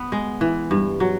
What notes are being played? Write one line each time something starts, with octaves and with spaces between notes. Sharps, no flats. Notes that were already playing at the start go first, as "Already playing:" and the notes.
Already playing: B3
G#3
E3
G2
F#3